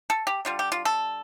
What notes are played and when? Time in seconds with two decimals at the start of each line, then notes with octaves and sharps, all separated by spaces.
0.10 A4
0.27 G4
0.45 D3 G3 F4
0.59 G4
0.72 F4
0.85 A4